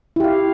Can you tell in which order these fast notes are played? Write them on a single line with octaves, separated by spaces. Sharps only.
E4 G4 F5